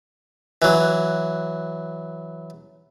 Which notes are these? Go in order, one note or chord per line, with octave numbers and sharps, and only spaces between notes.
E3 F#3